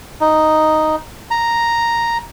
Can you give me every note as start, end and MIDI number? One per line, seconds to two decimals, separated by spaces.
0.21 0.96 63
1.31 2.18 82